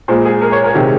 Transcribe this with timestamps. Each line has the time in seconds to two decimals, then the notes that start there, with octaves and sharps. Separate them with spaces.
0.08 A#2 G#3 C5
0.25 G#4
0.41 A#4
0.52 C#5
0.64 A#4
0.74 C3 D#3 G#3 F#4